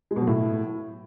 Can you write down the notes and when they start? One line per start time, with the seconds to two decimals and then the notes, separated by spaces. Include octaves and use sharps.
0.11 G#3
0.16 B2
0.22 F#3
0.27 A2